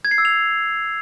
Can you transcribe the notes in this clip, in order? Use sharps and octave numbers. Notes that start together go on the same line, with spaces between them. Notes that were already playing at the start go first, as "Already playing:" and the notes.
G#6
C7
E6
F7